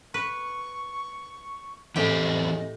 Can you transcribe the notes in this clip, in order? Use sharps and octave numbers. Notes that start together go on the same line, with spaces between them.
B4 C#6
A2 E3 C4 G4 G#4 D#5 G5